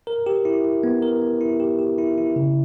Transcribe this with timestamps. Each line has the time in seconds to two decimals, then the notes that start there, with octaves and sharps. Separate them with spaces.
0.07 A#4
0.26 G4
0.45 E4
0.64 E4
0.84 B3
1.03 A#4
1.22 B3
1.41 E4
1.60 G4
1.79 G4
1.98 E4
2.18 E4
2.36 C#3